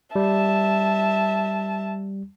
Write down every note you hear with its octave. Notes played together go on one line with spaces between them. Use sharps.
G3 E5 A5